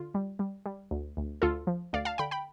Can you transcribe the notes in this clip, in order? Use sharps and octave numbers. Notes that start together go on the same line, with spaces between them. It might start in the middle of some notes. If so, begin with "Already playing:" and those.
Already playing: D3 F4
G3
G3
G3
D2
D2
D2 F4 A4
F3
D2 D5 F5
F5 A5
D3 G5 B5
G5 B5